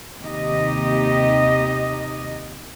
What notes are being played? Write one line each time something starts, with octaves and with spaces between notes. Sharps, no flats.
D#2 C3 D#4 G4 D#5